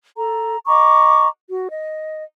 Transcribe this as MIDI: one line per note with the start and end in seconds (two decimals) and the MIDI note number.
0.16 0.57 69
0.16 0.57 82
0.66 1.27 75
0.66 1.27 82
0.66 1.27 85
0.66 1.27 86
1.50 1.68 66
1.69 2.23 75